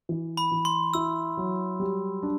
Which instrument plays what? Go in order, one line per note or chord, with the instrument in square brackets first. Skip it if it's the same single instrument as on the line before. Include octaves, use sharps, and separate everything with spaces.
[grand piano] E3
[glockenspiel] B5
[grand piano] E3
[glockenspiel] C6
[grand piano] E4 [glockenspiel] E6
[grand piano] F#3
G3
D4